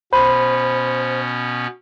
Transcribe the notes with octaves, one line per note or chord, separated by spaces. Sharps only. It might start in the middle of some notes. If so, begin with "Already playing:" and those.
B2 B3 C#4 C5 B5